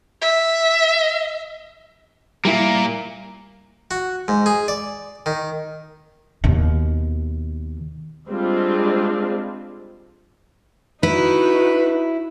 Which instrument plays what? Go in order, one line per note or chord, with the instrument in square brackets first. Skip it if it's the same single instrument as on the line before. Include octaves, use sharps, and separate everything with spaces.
[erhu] E5
[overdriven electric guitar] A#2 A#3 [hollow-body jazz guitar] G3 E4
[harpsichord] F#4
G#2
G#4
D5
D#3
[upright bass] D#2 B2
[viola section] G3 G#3 C4 D4 F4
[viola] D#4 F#4 [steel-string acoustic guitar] E4 [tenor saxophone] B4